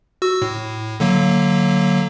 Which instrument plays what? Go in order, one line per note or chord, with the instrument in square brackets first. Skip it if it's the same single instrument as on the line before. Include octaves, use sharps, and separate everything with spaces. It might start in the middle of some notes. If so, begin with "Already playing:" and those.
[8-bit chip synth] F#4 E6
A2
D3 F#3 A#3